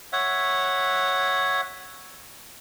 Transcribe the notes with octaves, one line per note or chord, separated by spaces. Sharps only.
C#5 E5 F#5